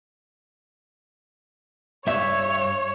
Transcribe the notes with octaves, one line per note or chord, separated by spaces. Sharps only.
G2 C#5 E5